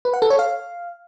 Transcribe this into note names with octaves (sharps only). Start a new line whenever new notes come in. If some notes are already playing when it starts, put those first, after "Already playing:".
B4
F#5
A4
C#5
F5